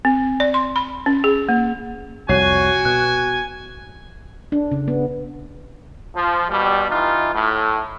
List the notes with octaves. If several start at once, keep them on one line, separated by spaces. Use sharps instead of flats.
C4
D5
C6
B5
C#4
G#4
A#3
C2 F2 F#4 C#5 G#5 C7
B2 F#6
D4
C#3
B3
F3
B2 G3
E3 D#4 F4
A2